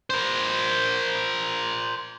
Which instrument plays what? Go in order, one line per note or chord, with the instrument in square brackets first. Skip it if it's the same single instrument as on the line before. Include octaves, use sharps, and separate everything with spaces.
[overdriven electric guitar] A#4 C5